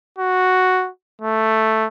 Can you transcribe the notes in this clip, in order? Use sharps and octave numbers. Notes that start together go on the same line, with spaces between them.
F#4
A3